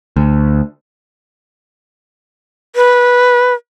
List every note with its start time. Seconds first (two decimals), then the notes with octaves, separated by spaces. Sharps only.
0.17 D2
2.76 B4